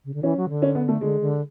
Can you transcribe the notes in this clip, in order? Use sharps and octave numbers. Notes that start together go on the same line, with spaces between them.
C#3
D3
E3 C#4
F#3
D3
C#4
B3
A3
D3 G#3
D3